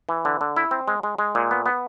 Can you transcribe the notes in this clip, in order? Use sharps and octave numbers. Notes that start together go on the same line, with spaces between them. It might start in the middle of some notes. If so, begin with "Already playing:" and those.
E3
D3
D3
E4
C4
G#3
G#3
G#3
A#2
B3
B3